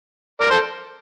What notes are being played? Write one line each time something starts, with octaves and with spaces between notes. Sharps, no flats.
A#4 D5
A4 C5